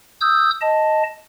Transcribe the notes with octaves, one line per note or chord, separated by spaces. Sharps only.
D#6 E6 G6
D#5 A5